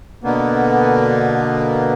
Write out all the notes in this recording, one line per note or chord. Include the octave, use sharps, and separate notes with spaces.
B2 D3 A#3 B3